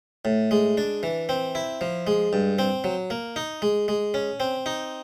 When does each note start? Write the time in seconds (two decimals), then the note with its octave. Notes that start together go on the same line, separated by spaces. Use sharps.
0.25 A2
0.51 G#3
0.78 D4
1.03 E3
1.29 C4
1.55 E4
1.81 F3
2.07 G#3
2.33 G2
2.59 C4
2.84 F#3
3.10 A#3
3.36 D#4
3.62 G#3
3.88 G#3
4.14 C#4
4.40 C4
4.66 D#4